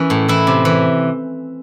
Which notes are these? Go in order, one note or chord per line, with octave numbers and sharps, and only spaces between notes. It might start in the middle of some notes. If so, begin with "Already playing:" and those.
Already playing: E3 C#4
A2
E3 E4
C3
E3